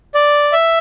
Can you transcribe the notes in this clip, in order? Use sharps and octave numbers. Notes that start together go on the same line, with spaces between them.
D5
E5